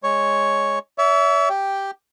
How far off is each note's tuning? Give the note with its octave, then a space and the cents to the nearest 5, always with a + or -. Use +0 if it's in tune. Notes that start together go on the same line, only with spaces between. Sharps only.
G#3 +0 C#5 +0
C#5 +45 E5 +0
G4 +0 G5 +0